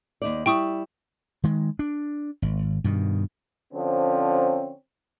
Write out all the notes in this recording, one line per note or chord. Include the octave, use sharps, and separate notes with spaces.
D#2 D#4 D5
G3 E4 G5 C#6 D#6
D#3 G#3
D4
G#1
G2 B2 D#3
D3 F3 C4 C#4